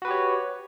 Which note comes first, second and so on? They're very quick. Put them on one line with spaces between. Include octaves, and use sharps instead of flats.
F#4 B4 G4 C#5